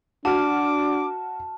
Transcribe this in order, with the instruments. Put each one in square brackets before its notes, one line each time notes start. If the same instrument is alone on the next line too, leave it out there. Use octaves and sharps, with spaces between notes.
[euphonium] D4 [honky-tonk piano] F#4 F6 [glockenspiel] A5 [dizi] D6